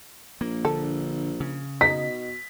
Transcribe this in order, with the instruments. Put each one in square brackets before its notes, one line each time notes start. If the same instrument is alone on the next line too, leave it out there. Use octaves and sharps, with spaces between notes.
[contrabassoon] A#1 [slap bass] A#3
[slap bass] D3 [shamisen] A4
[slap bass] C#3
[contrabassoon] B2 [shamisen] D#4 [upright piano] B6